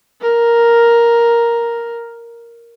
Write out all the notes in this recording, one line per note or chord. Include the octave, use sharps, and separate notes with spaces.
A#4